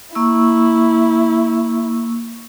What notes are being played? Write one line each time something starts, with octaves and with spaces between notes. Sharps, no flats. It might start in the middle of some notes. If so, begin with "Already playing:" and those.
A#3 E4 C#6 E6